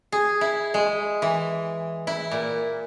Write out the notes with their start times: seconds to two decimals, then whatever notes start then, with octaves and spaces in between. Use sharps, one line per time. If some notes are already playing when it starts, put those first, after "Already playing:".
0.12 G#4
0.41 E4
0.74 G#3
1.22 E3
2.07 E4
2.31 A#2